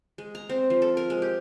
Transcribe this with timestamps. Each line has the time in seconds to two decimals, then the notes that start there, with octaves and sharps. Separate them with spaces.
0.18 G#3
0.35 A#5
0.49 C4
0.70 F3
0.82 A4
0.97 A#4
1.10 G#3
1.22 G4